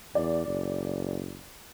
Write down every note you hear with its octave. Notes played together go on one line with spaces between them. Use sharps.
E2 D5
F#1